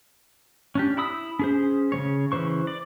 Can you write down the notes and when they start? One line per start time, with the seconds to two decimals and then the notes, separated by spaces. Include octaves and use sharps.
0.75 C#4 D4 G4
0.97 E4 B5 D#6 E6
1.39 C#4 G#4 C5
1.92 C#3 G3 C#5
2.32 C#3 E3 C5 C#6
2.67 D5